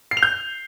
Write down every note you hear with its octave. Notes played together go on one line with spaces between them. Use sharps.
C7
F7
G6